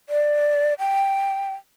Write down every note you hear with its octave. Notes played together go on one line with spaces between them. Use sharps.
D5
G5